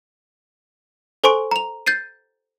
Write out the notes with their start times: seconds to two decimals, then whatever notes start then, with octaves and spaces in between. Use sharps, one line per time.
1.24 A4 C5 G#5 C6 C#6 D7
1.51 A#5 F7
1.86 G6 A6 C7 D#7